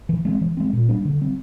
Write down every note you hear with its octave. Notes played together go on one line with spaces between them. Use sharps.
E3
G#3 C4
E3
G#3 C4
A#2
G3 A#3 D4
D3
G3 C4